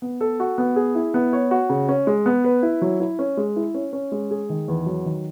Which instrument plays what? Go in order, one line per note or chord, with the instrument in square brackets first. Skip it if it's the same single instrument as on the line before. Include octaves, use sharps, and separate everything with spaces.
[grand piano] B3
A4
F#4
B3
G#4
E4
B3
C#5
F#4
C#3
C#4
G#3
B3
B4
E4
F#3
E4
C#4
G#3
E4
C#4
C#4
G#3
G#4
D#3
E2
F#3
D#3